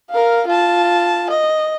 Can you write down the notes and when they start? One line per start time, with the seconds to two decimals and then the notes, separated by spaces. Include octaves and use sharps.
0.10 A#4 F5
0.47 F4 A5
1.30 D#5